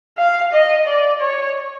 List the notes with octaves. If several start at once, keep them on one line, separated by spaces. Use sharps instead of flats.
F5
D#5
D5
C#5